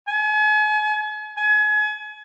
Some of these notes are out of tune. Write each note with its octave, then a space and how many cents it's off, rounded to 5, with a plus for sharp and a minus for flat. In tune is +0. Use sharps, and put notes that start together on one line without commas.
G#5 +40
G#5 +35